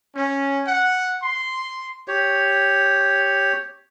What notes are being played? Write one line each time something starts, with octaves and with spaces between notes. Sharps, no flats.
C#4
F#5
C6
G4 C#5